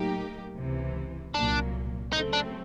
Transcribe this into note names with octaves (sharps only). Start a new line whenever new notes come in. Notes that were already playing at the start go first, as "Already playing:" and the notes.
Already playing: A2 F#3 A#3 D#4 G4
C#2 C3 E3
C2 A#2 F#3 A#3 D4
C#3 F#3 A3 C4 D#4
D4